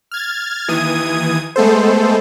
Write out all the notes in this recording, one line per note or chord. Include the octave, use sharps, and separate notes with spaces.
F6 G#6 A6
D#2 E3 D#6 G#6 D#7
G#3 A3 B3 A4 C5